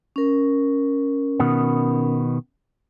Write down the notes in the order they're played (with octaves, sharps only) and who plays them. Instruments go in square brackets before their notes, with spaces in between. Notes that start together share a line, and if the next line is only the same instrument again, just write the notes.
[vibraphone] C#4 A#4
[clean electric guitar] B2 D#3 B3